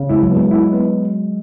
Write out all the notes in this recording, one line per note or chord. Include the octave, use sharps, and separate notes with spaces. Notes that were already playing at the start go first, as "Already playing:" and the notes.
Already playing: C#3
G#3 E4
F#3
B3
G#3
E4
B3